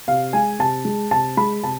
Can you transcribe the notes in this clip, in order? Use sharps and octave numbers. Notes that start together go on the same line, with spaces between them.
C3 F5
G#3 G#5
C3 A5
G#3
C3 A5
G#3 B5
C3 A5